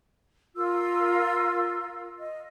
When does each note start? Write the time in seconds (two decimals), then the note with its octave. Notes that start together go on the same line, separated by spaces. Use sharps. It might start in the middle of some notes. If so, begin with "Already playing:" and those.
0.56 F4 A#4 E6
2.18 D#5